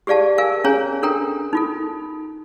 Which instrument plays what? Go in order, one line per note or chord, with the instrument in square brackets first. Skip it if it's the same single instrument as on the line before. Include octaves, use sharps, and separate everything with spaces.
[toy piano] G4 G#4 D5 F5 A5
A#4 F5 G#5
C#4 G#4 C#5 G#5 A#5
D4 A4 A#4 G5 A#5
D#4 F4 A4